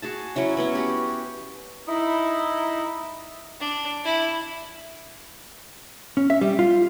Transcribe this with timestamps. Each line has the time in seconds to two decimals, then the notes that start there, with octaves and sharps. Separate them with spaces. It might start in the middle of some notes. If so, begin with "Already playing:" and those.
0.02 F#4 G#4 A5
0.35 F#3 C#4 E4 C#5
0.57 F#3 B3 C#4
0.73 F#4 G4 B4
1.88 D#4 E4
3.61 D4
4.04 E4
6.17 C#4
6.30 E5
6.41 G3
6.59 F4